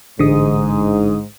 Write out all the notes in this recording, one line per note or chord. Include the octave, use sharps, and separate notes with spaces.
A1 G#2 D3 D#6